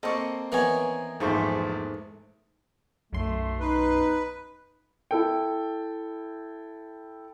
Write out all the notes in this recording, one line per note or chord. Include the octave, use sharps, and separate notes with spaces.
A#3 C4 A4 D#5 C#6
D#3 E3 B3 A#4 C#5 G#5
A#1 E2 G#2 A3 C5 C#6
B1 F#2 A3 C6
D#4 B4
E4 A4 G5